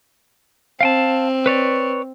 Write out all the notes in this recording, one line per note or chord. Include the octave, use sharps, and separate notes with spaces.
C4 F5 G5 A5
B4 C#5 D5